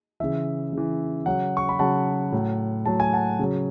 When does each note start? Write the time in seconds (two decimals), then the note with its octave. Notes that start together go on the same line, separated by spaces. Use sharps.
0.20 C#3 E3 E5
0.73 C#3 E3
1.26 C#3 F#3 F#5
1.57 C#6
1.69 B5
1.79 C#3 F#3 F#5 A5
2.32 A2 F#3
2.86 A2 F#3 A5
3.00 G#5
3.13 F#5 A5
3.39 C#3 F#3